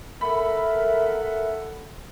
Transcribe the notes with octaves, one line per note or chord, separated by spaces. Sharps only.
A4 A#4 E5 F#5 B5